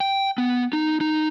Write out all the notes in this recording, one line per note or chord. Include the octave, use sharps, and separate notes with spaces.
G5
B3
D#4
D#4